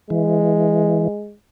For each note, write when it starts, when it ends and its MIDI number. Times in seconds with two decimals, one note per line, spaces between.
0.10 1.08 52
0.10 1.34 56